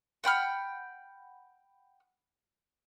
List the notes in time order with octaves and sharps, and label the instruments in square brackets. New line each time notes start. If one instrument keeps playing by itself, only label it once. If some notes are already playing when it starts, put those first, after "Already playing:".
[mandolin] F#5 G5 B5 F6